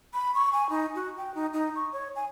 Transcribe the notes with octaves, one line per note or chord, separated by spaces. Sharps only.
B5
C#6
G#5
D#4
F#4
G5
D#4
D#4
C#6
C#5
G#5